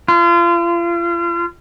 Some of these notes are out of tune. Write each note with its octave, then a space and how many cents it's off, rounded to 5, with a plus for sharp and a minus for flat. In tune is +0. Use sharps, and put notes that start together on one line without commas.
F4 -35